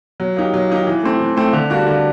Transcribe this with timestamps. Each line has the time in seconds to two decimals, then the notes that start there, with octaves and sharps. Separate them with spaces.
0.20 F#3
0.36 A#3 D#4 G4
0.54 F#3
0.69 A#3 D#4 G4
0.87 E3
1.03 A3 C4
1.20 E3
1.37 A3 C4
1.53 D3
1.70 G3 A#3 D4 F#4
1.87 D3